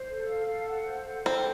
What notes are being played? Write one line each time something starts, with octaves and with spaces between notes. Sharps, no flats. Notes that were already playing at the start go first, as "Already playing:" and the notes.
Already playing: C5
A4
F5
A4
F#5
C5
A4
C4 A4